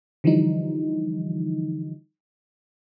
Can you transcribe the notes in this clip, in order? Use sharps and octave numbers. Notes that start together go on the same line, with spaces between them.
D3 E3 F3 G3 D#4